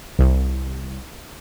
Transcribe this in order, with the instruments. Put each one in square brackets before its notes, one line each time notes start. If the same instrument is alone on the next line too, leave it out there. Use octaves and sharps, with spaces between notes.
[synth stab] C2